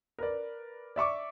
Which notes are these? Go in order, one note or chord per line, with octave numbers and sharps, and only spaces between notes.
A#4 B4 D5
D5 E5 C#6 D6